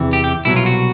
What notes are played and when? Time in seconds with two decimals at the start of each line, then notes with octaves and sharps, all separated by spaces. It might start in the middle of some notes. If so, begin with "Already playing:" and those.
Already playing: E2 C3 E3
0.13 G4
0.24 G4
0.45 C2 B2 F#3 E4
0.56 F4
0.66 F#4